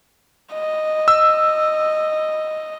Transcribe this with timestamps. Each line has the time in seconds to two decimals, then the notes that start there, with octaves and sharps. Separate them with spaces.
0.54 D#5
1.08 E6